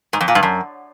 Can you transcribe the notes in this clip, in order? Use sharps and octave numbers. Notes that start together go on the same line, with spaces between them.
G#2
F2
A#2
G2
F#2